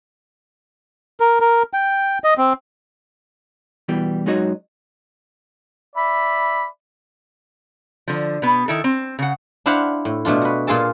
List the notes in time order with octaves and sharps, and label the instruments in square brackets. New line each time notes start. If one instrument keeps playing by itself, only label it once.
[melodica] A#4
A#4
G5
D#5
C4
[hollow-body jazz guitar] B2 E3 G3 G4
F#2 G#3 D#4 F#4 C#5 D#5
[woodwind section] D5 E5 B5
[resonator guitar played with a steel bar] D3 F3
B2 B3
D#3 E4 A4
C4
C#3 F#5
[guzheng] D4 E4 C5 F5 F#5 B5
A2
B2 A3 D4 F4
F#4 B4
A#2 F4 G#4 A4 A5